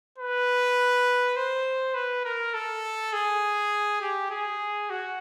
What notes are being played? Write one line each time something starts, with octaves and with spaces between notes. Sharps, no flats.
B4
C5
B4
A#4
A4
G#4
G4
G#4
F#4